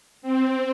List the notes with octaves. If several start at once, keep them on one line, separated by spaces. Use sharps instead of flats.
C4